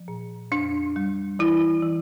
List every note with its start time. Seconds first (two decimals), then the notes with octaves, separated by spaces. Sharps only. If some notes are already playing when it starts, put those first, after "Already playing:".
Already playing: F3
0.08 A#2
0.52 F2 D4
0.96 G3
1.39 E3 E4
1.83 E3